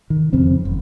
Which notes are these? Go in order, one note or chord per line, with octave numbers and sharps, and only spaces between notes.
D#3
F2 C#3 C4
F#1